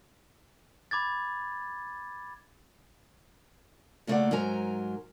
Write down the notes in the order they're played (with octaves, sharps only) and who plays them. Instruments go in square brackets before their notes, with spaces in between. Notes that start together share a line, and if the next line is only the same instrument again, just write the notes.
[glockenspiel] B5 D6 G#6 A6
[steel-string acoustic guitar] A#2 C#3 A3 A#3 D5 F#5
G#2 F#3 A#4 G#5 A#5